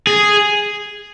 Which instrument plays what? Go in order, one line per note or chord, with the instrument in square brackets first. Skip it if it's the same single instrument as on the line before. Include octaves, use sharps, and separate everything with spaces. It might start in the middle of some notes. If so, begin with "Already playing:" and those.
[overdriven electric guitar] G#4